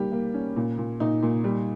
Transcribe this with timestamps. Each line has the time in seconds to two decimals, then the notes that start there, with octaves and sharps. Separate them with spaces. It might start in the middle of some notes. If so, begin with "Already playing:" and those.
Already playing: G3 A#3 G4
0.12 A#3
0.34 C#4
0.56 A#2
0.78 A#2
1.00 A#2 D#4
1.23 A#2
1.44 G3